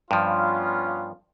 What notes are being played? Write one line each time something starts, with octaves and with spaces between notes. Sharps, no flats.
G2 F3 B3 C#4 F4